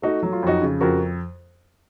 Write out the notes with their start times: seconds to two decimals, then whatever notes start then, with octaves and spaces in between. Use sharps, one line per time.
0.02 A3 D#4 F#4
0.23 F#3
0.32 F4
0.43 F2 D#4 F#4
0.62 C#3
0.81 F2 F#4 A#4